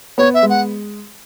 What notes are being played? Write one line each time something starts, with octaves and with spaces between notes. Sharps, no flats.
B3 C#5
E5
G#3
F#5